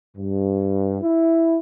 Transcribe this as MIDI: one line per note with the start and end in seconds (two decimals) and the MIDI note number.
0.17 1.01 43
1.02 1.58 64